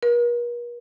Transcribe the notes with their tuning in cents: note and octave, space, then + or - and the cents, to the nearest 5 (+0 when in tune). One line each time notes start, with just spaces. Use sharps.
A#4 +45